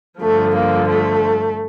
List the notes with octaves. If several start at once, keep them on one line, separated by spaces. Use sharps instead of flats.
G2 D3 F3 A3
A#3
A3